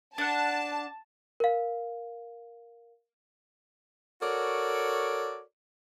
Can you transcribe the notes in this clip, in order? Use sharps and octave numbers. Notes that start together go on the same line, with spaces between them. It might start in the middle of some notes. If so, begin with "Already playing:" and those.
D4 F#5 A5
A#4 F5
F#4 A4 A#4 C#5 D5